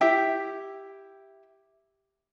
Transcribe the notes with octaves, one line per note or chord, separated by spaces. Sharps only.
E4 G4 E5 G5